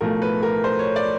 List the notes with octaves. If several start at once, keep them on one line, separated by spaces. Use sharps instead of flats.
B1 A2 F3 A3 A#4
B4
A#4
C5
C#5
D5